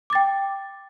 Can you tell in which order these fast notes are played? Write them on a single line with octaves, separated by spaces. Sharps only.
D6 A6 G5